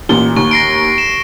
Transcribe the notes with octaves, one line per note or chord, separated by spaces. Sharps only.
A1 A#2 G7
D#2 C#6
A#6 C7 D7
E7